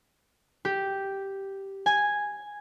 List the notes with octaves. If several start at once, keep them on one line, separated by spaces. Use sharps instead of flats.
G4
G#5